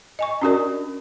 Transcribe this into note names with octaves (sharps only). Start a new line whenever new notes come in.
D#5 G#5 C#6
C#4 D4 F#4 G4 A#4 D5